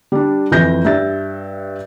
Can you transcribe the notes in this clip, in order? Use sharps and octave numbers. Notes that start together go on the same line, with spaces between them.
G3 D4
F2 E3 G6 A#6
G2 E5 A6